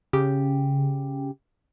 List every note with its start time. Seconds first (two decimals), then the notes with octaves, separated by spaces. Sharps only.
0.13 C#3 G4